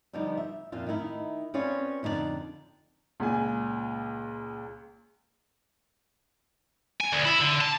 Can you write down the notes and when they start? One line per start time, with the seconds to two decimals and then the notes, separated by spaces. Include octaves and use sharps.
0.13 D3 F3 G3 B3 D#4
0.37 E5
0.72 F2 A#2 F4
0.86 D#3 A3 D#4 E4
1.54 C4 C#4 F4 G#4 B4 D5
2.03 F2 D3 D#4 E4 D5
3.20 C#2 A#2 G#5
7.01 G#5
7.12 D2
7.25 E4
7.40 D3
7.61 A5